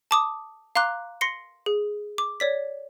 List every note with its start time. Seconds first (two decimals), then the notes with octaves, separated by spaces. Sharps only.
0.11 A5 D6 D#6
0.75 F5 A#5 C6 D6 F#6
1.21 C6 A#6 C7 C#7
1.66 G#4
2.18 D6
2.40 C#5 D5 B6